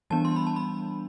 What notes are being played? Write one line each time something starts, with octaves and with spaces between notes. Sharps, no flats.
E3 G3 B3 D4 A5
C6
B5
A5
B5